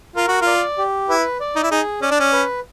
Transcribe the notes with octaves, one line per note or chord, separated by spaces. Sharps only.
F4 A#4
F#4
F4
D5
G4
E4 B4
D5
D#4
E4
D#4 G#4
C#4 D5
D4
C#4
B4